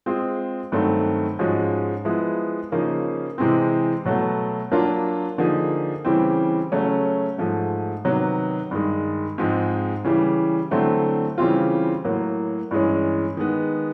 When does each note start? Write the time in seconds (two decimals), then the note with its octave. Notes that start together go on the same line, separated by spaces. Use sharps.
0.06 G#3 C4 F4 G#4
0.72 G2 D#3 F#3 A3 C4
1.39 G#2 F3 G#3 C#4 F#4
2.05 F3 G#3 B3 E4
2.72 C#3 F3 A#3 D#4
3.38 C3 E3 G#3 C4
4.05 B2 F#3 A3
4.71 F#3 A#3 D4 F4
5.38 D3 F3 A#3 D#4 G#4
6.05 C#3 E3 G3 C4
6.72 C#3 F#3 A3 C#4
7.38 G#2 F3 A3
8.05 C3 D#3 F#3 B3
8.71 G2 D#3 G#3
9.38 G#2 F3 G#3 C4
10.04 C#3 E3 G3
10.71 D3 F#3 A3 C4 E4
11.38 C#3 E3 G3 C4 F4
12.04 A2 F#3 A#3
12.71 G2 E3 G#3 C#4
13.37 D#3 G#3 B3